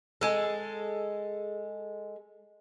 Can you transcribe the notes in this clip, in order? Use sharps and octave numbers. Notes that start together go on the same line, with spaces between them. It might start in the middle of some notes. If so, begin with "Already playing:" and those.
G#3 A4